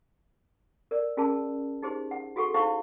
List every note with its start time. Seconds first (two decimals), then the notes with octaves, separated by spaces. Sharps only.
0.91 A#4 D5
1.17 C#4 F4 G#4 A#4 A5
1.82 D#4 G4 G#4 C5
2.11 F#5
2.36 F4 F#4 G#4 A4 F#5 C#6
2.54 D#4 E4 C5 F5 F#5 C#6